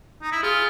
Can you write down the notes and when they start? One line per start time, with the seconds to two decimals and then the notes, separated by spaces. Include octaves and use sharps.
0.22 D#4
0.32 E4
0.43 F4 G#4